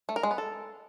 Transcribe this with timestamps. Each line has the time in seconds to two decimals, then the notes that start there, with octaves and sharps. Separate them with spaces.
0.09 A3
0.16 A#4
0.23 G#3
0.31 B3
0.38 A4